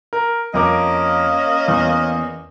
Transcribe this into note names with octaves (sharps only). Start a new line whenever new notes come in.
A#4
F2 A#3 C#4 A#4 D#5 D6
E2